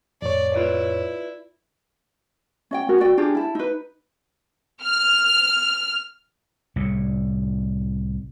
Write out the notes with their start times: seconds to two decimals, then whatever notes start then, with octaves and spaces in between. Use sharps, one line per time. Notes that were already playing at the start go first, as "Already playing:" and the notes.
0.22 F2 A2 C#5 D5
0.54 E4 F4 B4 D5
2.71 C#4 D#5 G5
2.89 C#4 F#4 A#4
3.00 F#4 D5 G5
3.17 D4 F4 G4 G#4
3.35 E4 A5
3.55 D#4 B4
4.84 F6
6.76 C2 A2